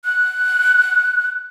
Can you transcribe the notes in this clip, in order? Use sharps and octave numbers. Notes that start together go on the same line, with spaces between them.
F#6